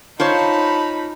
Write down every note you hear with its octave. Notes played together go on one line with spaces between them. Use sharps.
D#4 F4 C5 C#5 A5 B5